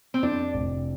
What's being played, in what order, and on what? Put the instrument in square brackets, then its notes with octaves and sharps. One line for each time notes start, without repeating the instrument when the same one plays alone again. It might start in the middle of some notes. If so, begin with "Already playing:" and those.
[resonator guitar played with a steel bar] C4
[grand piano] F2 [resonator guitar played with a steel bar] D4
[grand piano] F1